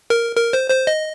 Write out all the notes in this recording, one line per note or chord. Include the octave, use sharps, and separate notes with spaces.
A#4
A#4
C5
C5
D#5